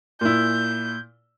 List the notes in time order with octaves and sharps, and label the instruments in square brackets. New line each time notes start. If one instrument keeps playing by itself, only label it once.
[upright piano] A#2 E4 [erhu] G6